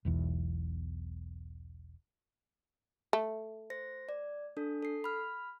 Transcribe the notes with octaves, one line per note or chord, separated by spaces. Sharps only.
E1 B1 E2
A3
C5 A#6
D5
D4 A4
A4 C7
B5 F6